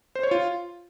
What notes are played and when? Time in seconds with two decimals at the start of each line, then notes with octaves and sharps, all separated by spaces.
0.15 C5
0.23 C#5
0.31 F4